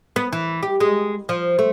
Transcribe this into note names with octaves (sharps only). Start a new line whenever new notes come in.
B3
E3
G4
G#3
F3
A3